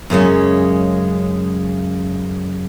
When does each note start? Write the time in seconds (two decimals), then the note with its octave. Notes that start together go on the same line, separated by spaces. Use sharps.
0.10 F#2 C#3 G#3 C#4